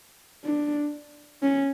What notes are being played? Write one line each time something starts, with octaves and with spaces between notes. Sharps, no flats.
D4
C#4